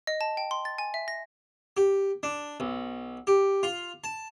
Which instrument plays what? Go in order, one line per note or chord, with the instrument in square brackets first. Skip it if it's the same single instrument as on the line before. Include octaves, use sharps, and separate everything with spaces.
[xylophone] D#5
A5
G5
C6
A6
G#5
E5
A#6
[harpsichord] G4
D4
B1
G4
F4
A5